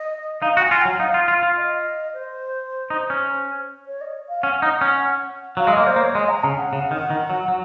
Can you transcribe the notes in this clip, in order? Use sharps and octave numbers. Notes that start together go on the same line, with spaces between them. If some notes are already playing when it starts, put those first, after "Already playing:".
Already playing: D#5
D#4 F5
F#4
G#5
F4
F#3 F#5
D#4 F5
F4
F4
F4
D#5
C5
D#4
C#4
C#5
D#5
F5
C#4 F#5
D#4
C#4
F#3 F5
G#3
A#3 D#5
C5
A#3
C#5
G#3 D#5
A#5
C#3 G#5
F#5
C#3
D#3
D#3
F#3
F#3